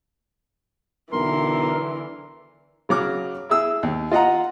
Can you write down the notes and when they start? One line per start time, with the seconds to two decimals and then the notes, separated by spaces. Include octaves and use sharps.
1.13 B1 D3 E3 A#4 C6
2.89 C#3 F#3 D6 F6
3.49 E4 G#4 E6
3.83 D#2
4.11 F4 D#5 F#5 A#5